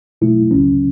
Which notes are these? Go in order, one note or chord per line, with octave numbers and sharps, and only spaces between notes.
B2 F#3 A3 E4
C#2 C#3 F#3 C#4